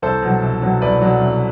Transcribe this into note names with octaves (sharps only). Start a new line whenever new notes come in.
C2 A4 C5
B2 F#3
C2
B2 F#3
C2 B4 D5
B2 F#3
C2